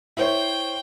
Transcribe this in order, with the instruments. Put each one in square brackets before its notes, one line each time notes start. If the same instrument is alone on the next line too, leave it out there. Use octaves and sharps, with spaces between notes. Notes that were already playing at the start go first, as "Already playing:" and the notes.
[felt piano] E4 C5 C#5 [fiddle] G5